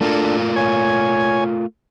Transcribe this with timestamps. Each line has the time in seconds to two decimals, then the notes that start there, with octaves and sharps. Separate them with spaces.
0.01 A3 D4 F4 A4 A#4
0.56 C#5 G#5